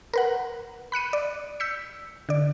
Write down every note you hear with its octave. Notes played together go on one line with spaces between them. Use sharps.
A#4 B4 F#5
B5 F#6 C#7 D#7
D5
E6 G6 B6 C#7
D3 D5